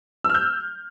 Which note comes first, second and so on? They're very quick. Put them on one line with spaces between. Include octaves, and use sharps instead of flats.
E6 F6 G6